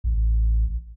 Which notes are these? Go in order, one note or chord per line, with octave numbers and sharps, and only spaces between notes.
A1